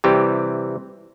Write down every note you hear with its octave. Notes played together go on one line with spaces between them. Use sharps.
C3 E3 G3 G4